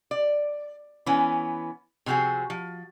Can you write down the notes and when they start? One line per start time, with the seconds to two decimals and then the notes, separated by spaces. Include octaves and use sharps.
0.11 D5
1.06 E3 B3 C#4
2.06 C3 F3 C4 F#4 G#4
2.50 F3